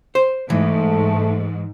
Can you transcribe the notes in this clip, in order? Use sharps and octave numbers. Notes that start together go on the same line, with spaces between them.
C5
G#2 E3 A3